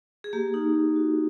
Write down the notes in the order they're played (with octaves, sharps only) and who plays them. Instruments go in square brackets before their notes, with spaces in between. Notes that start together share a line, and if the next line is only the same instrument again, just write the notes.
[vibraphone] G#4
A#3 G4
D#4
A#3
F#4